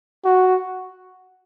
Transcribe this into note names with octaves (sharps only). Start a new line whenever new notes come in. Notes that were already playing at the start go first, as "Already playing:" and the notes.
F#4